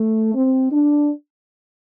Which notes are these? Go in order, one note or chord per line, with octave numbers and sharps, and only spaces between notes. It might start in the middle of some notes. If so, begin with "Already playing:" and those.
Already playing: A3
C4
D4